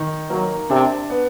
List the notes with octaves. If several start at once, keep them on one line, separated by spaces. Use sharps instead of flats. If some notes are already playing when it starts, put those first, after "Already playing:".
Already playing: D#3
F#3 A#3
C3 D4
B3